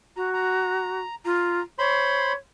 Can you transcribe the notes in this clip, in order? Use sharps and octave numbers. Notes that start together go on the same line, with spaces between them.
F#4 A#5
A#5
F4 A#5
C5 C#5 B5 C6